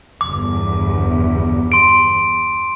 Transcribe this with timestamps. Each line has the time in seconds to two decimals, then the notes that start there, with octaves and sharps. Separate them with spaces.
0.21 G1 E2 D6
1.72 C6 D7